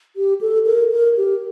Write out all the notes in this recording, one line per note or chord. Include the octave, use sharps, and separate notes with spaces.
G4
A4
A#4
A#4
G4